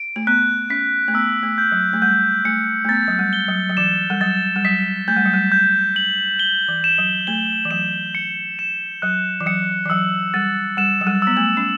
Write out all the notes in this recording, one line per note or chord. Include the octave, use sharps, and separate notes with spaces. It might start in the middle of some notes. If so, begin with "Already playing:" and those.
Already playing: D7
A3
B3 F#6
C#4 B6
A3
B3 E6
A3
G6
F#3
A3
G3 G6
A3 C#7
A3
B3 A6
F#3
G3
G7
F#3
F#3
E3 E7
G3
F#3 A6
G3
F#3 B6
A3 G6
G3
F#3
G3
G6
F#7
G7
E3
E7
F#3
A3 G7
E3
F#3 E7
C#7
E7
F#3 F#6
E3
F#3 C#7
E3
F#3 E6
G3 A6
G3 E7
F#3
G3
B3 E6
A3
C#4